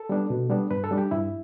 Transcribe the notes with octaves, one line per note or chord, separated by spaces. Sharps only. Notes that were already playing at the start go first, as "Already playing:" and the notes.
Already playing: A4
G3 B3 D4
B2
G3 B3 D4
G2 B4
A4
G3 D4
G4
G2 E4